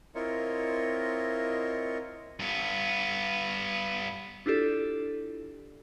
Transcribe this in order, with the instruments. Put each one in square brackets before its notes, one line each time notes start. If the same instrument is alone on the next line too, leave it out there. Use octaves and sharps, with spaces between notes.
[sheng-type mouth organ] C4 E4 F4 A#4 C#5 D#5
[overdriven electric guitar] G2 B3
[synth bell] D4 E4 F4 G4 A4 D5